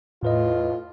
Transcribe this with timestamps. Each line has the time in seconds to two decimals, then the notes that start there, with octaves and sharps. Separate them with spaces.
0.23 E2 A2 F4 B4 D#5